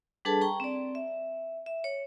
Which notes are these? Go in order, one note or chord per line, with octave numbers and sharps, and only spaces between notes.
G3 D4 G#4 A4 B4 A5
G5 A#5 C#6
C4 D5
E5
E5
C#5